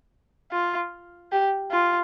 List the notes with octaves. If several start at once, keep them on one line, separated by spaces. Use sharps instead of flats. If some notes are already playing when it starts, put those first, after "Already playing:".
F4
G4
F4